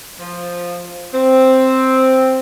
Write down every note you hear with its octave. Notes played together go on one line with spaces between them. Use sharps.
F3
C4